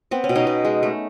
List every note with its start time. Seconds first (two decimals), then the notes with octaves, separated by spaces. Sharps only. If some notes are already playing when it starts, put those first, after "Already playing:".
0.11 B3 C4
0.24 C#4
0.29 B2
0.35 C#4 D#4
0.47 B2
0.65 G#3
0.83 A3